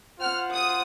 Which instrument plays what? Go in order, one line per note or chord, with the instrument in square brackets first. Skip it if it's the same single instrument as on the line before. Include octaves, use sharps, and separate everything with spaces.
[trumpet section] F4 C5 F#5 [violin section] F6
[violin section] D#6